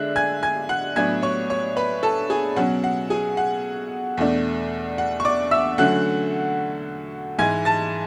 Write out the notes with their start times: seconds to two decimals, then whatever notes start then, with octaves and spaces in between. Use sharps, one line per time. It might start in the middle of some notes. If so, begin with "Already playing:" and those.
Already playing: D3 G#3 D4 E5 F#6
0.16 G#5 G#6
0.43 G#5 G#6
0.69 F#5 F#6
0.96 A2 F#3 B3 D4 G#5 G#6
1.22 C#5 C#6
1.50 C#5 C#6
1.77 B4 B5
2.03 A4 A5
2.30 G#4 G#5
2.56 B2 F#3 C#4 F#5
2.84 F#5
3.10 G#4 G#5
3.37 F#5
4.17 E2 B2 A3 D4
4.98 F#5
5.20 C#6
5.25 D5 D6
5.51 E5 E6
5.78 D3 F#3 A3 C#4 F#5 F#6
7.39 G#2 E3 G#3 G#5 G#6
7.65 A5 A6